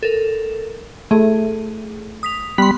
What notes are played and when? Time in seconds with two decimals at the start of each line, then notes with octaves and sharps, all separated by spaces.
0.03 A4 A#4
1.11 A3 G#4
2.23 D#6 B6 F7
2.58 G3 B3 B5 C6